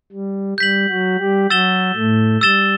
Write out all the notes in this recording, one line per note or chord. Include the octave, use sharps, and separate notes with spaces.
G3
G3 G6 B6 F#7
F#3 F#4
G3 G4
F#3 F#4 E6 A6 E7 G7
A2 A3
G3 E6 A6 E7 G7